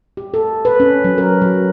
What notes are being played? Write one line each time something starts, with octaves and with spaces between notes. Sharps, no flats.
G4
A4
B4
C#4
F#3
A#4
F#3